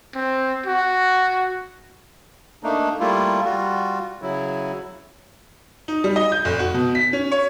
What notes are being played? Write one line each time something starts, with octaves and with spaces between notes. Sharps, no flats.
C4
F#4
A3 A#3 D4 D#4
G3 A3 A#3 E4 F4
G3 F4 F#4
C#3 F#3 E4
D#4
G3
D#5
G6
F1
F#4
B2
B6
C#4
C#5